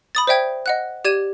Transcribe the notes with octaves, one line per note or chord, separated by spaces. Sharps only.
B5 D#6 A6
C5 D5 E5 G5 G#6
D#5 F#5 F#6
G4 D5 G#6 D#7 E7